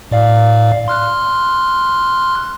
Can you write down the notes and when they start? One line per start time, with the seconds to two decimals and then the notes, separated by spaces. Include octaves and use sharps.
0.11 A2 D5 F5
0.88 C6 F6 F#6